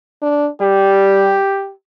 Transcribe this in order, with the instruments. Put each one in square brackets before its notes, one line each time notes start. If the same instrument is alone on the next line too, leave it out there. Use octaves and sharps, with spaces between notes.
[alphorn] D4
[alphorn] G3 [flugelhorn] G4